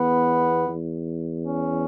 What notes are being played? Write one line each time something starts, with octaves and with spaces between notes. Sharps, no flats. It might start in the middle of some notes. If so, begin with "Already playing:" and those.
Already playing: E2 B3
E2
C#4